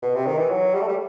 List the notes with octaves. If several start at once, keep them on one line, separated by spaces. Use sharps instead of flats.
B2
C3
D#3
E3
F#3
G3
A3
G3